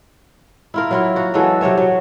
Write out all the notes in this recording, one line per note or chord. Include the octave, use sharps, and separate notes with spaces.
E4 F4 A#4
F#3 E4 F4
A#3 F#4
E3 F#3 G#3 A4
C3 F#3 C#5 E5
F#3